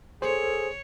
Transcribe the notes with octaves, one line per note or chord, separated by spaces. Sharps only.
G#4 A4 C5 C#5